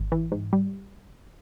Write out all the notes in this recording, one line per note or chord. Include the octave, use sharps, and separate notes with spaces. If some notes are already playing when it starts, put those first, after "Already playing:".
Already playing: G#1
E3
G#2
G3